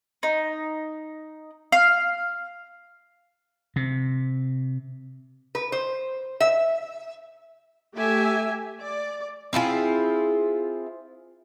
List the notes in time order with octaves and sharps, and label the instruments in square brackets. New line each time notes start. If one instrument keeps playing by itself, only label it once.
[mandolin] D#4
F5
[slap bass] C3
[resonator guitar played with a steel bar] B4
C5
E5
[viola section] A3 G4 E5 G#5
D5
[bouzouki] C4 E4 F4 G#4